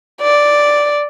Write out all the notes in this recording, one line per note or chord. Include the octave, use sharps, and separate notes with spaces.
D5